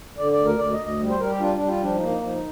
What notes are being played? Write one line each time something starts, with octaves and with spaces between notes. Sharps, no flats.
D3 D5
D5
D2
A#4
D2 D5
D#5
D2
D#5
G3
C5
G3 A#4
G4
D4 F4
D4
G3
F4
F3 D4
D#4
A#3
D#4
F3 D#4